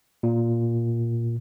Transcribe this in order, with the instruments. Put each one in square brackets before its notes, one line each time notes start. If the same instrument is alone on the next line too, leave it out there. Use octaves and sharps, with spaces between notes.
[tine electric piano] A#2